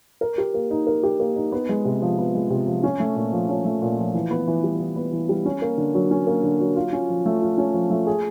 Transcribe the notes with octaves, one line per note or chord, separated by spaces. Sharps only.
A#4
G4
A#3
D#4
A#4
G4
A#3
D#4
B3
G#3
C3
F3
B3
G#3
C3
F3
C#4
A3
A#2
F3
C#4
A3
A#2
F3
E3
B3
E3
G3
E3
B3
E3
G3
C#4
A#3
D3
F#3
C#4
A#3
D3
F#3
F4
C#4
F3
A3
F4
C#4
F3
A3
G#4